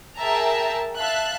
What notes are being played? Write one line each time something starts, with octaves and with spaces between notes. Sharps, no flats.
G#4 A#4 E5 G5 A5 A#5
E5 F5 A5 F#6